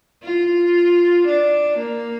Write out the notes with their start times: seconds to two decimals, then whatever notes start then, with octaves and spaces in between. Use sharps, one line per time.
0.23 F4
1.26 D4
1.77 A#3